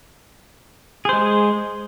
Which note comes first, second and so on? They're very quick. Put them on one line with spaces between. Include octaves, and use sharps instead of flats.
G#4 C5 G#3